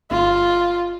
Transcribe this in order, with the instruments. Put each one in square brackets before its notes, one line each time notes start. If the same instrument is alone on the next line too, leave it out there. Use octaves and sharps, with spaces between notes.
[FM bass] G1 [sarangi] F4